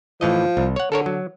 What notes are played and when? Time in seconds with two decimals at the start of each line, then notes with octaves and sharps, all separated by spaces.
0.21 A2 E3 F3 D#5
0.57 C2
0.76 C#5 F#5
0.92 D3 A4 A#4 C#5
1.06 F#3